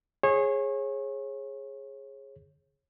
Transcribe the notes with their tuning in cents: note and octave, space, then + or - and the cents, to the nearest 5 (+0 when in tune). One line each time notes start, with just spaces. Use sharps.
G#4 +0 C#5 -30